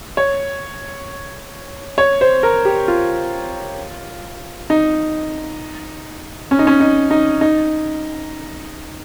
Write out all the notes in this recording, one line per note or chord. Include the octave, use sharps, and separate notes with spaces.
C#5
C#5
C5
A#4
G4
F4
D#4
C#4
D#4
C#4
D#4
D#4
D#4